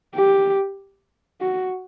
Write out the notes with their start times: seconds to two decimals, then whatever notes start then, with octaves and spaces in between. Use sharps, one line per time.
0.15 G4
1.41 F#4